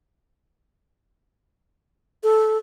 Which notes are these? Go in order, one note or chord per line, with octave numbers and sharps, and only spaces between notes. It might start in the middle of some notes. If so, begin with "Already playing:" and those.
A4